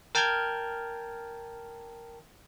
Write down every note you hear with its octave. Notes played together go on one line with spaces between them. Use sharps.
A#4 G5 A5 F6 G6 G#6